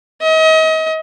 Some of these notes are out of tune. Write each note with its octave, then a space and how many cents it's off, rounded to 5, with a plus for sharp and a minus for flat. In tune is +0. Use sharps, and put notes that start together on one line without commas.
D#5 +35